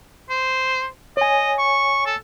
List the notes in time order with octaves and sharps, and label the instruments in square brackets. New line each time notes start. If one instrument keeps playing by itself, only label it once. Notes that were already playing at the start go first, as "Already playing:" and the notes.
[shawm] C5
[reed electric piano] C#5 G#5 [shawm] D#5
[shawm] C#6
A4